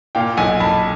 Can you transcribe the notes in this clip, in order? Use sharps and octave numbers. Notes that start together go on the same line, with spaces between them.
A#2 F5 G5
B1 F#5 G#5
B1 A5 B5